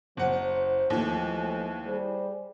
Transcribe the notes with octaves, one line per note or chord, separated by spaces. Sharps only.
F#1 F#3 E4 C5 F#5
D#2 E3 F3 G#3 A3
G3 G#4 C5